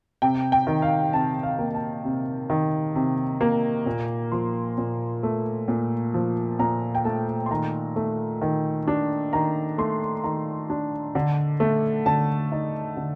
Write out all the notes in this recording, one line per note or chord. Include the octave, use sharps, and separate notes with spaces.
C3 G5
G5
D#3
F5
C3 A5
F5
A#3
A5
C3
D#3
C3
A#3
A#2
F3 C6
A#2
A3
A#2
F3
A#2 A#5
G5
A3 A5
C6
D#3 A#5
A3
D#3
D4
D#3 A#5
A3 C6
D#3 A#5
D4
D3
A3
D3 A5
D#4
D3